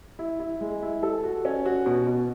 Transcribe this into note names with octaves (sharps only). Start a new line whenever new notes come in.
E4
E4
G#3
E4
A4
F#4
C#4
F#4
B2
B2